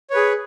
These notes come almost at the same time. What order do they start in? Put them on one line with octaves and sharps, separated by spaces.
C#5 B4 G#4